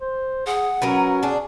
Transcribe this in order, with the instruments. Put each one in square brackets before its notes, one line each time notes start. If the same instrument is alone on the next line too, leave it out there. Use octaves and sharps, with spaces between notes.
[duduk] C5
[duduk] G#4 [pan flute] F#5
[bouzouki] F#3 A#4 B4 [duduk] C#4
[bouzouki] D4 G#4